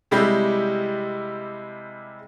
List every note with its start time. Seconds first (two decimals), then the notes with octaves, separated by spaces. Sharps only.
0.11 C3 G3 G#3 E4 G4